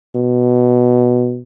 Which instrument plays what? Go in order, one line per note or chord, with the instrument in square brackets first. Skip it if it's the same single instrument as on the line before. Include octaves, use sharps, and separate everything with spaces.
[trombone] B2